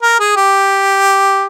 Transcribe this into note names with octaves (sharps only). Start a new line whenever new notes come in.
A#4
G#4
G4